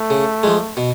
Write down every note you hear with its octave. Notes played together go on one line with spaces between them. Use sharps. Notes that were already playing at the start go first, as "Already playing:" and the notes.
Already playing: A3
C#3
F3 G#3
B2